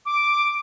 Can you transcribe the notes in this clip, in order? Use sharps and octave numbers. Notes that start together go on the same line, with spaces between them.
D6